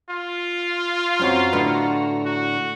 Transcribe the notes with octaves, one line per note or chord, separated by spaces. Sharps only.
F4
F#2 C4 F#4 C#5 A#5
A2 D3 B4
F#4